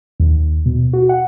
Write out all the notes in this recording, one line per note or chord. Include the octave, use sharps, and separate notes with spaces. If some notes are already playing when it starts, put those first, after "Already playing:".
D#2
B2
F#4
F#5